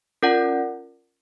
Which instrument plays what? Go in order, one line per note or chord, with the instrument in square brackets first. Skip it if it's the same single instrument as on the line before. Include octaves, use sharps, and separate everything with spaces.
[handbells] C#4 F4 A#4 D5 F#5